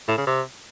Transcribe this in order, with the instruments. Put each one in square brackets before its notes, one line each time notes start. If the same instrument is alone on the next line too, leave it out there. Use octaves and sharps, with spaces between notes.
[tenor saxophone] A2
C#3
C3